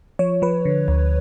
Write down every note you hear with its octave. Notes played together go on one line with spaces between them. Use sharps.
F3 C#5
F3 B4
D3
D2